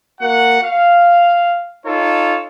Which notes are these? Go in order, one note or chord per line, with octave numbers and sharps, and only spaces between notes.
A#3 F#4 F#5
F5
D#4 F4 A4 C#5